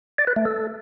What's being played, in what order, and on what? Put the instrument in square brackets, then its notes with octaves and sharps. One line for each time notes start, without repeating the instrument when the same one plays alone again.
[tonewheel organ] D5
B4
A3
A4